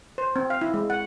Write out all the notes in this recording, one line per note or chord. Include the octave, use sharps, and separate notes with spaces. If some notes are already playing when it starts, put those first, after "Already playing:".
C5
C4
F5
E4
G#3
F#5